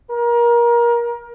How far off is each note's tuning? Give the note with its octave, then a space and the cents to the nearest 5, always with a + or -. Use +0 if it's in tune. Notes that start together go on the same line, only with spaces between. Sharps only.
A#4 +25